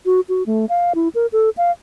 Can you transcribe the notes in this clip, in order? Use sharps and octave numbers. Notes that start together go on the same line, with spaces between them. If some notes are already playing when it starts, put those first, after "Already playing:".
F#4
F#4
A3
F5
E4
A#4
A4
F5